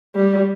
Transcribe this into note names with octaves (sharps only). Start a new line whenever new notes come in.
G3